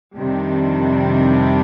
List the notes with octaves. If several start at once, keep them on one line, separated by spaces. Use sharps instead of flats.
F2 C3 D#3 G3 D4